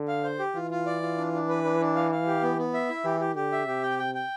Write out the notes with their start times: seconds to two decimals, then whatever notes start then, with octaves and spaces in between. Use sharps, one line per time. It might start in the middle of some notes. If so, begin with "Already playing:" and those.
Already playing: D3
0.08 F5
0.24 C5
0.39 G4
0.55 E3 F4
0.71 F4
0.86 D5
1.02 F4
1.18 D4
1.33 D4
1.49 B4
1.64 D4
1.80 D4
1.96 F5
2.12 F5
2.27 G4
2.42 B3
2.58 B3
2.74 E5
2.89 E4
3.04 E3 G4
3.20 G4
3.36 D3 G4
3.52 E5
3.67 C3 G4
3.83 G5
3.99 G5
4.15 G5